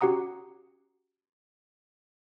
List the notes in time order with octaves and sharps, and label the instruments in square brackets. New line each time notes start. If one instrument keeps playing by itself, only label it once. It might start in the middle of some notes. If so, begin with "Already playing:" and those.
[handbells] C#4 F#4 G4 F#5 A#5 D#6